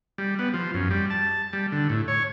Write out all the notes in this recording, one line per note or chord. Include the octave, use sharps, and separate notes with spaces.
G3
B3
F3
F#2
G3
A5
G3
D3
A2
C#5